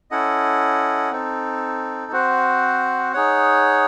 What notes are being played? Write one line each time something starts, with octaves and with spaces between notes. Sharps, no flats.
C#4 E4 A4 D#5 F#5
C4 D#4 A4
C4 F#4 C5 F#5
D#4 G#4 C#5 F#5